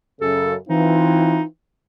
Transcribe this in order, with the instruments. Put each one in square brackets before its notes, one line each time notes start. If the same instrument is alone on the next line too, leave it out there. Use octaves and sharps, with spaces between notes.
[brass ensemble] F#2 C#3 [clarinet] A4
[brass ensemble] E3 C4 F4 [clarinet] D#4